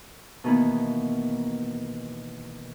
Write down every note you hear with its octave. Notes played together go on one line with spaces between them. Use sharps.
B2 D#3 E3 A#3 B3